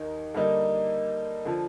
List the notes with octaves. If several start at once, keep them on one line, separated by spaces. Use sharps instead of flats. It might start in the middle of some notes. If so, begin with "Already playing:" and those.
Already playing: D#2 D#3 D#4
D3 G3 A#3 D#4
D3 F3